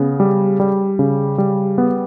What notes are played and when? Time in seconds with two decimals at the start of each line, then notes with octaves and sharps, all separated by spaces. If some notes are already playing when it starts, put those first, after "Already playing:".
Already playing: C#3 B3
0.20 G3
0.60 G3
0.99 C#3
1.38 G3
1.78 B3